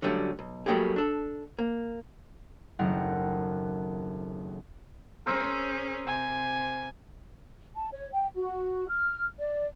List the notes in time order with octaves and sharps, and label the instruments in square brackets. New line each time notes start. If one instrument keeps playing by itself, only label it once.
[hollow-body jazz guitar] D3 F#3 G3 A3 C#4
B1
F#3 G3 A3 A#3 G4 G#4
D4 A4
A#3
[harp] F#1 D#2 A3 C4 A#4 F#5
[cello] C#4 G#4 [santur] A#4 C5 E6
[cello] C3 [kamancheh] G#5
[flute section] A5
C#5
G5
F#4
F6
D5